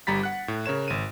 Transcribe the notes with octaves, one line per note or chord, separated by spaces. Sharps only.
G1 G3 A#5 B5 A6 B6
F#5 F#6
A2
C#3 A#4 C#5 E7
G#1 D#7